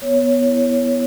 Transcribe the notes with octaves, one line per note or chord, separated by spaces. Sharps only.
B3 C#5
B3
E4